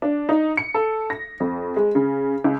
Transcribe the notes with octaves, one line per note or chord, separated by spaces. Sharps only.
D4
D#4
C#7
A4
A#6
F2
G#3
C#3
C#2